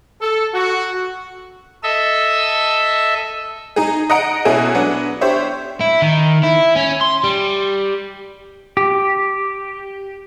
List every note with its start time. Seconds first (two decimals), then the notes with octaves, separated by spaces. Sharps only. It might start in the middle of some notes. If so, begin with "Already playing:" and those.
0.21 A4
0.54 F#4
1.83 A4 D#5 E5 E6
3.76 D#4 G#4
4.10 D#5 F#5 A#5 D7
4.45 B2 C#4 E4 G#4 A4
4.74 F#3 B3 D4
5.21 D4 G4 C5 C#5 E5
5.81 E4
6.02 D#3
6.44 E4
6.76 C#4
7.01 C6
7.24 G3
8.77 G4